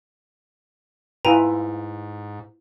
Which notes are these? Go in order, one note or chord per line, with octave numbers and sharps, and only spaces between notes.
G#2 E4 F4 B4 G5 G#5 A#5